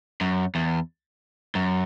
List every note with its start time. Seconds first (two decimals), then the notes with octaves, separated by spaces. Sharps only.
0.21 F#2
0.55 E2
1.55 F#2